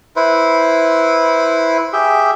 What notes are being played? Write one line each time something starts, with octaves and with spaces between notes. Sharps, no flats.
E4 B4 C5
G4 G#4 E5